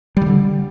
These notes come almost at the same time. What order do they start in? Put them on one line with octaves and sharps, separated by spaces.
G3 D#3 D3